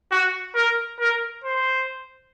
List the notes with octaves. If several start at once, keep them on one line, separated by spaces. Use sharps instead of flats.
F#4
A#4
A#4
C5